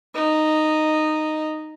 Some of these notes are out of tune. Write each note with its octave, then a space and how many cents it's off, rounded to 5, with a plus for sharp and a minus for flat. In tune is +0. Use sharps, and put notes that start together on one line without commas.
D#4 -10